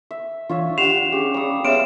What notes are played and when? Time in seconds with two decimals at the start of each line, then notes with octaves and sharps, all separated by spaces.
0.11 E5
0.49 E3 D4 F4 C#5 E5
0.78 D4 G4 F#5 C6 C7 E7 F7
1.12 C#4 G4 G#4 C#6
1.34 G3 A#5 D#6
1.65 B3 C#5 E5 C6 F6 D7 E7